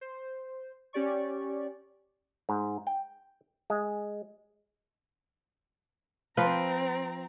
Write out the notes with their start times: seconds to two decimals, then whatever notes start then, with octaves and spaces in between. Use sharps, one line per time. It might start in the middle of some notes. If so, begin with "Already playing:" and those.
0.01 C5
0.93 C#4 G4 D5 C#6
2.49 G#2
2.87 G5
3.70 G#3
6.37 F3 C4 F4 B4 A#5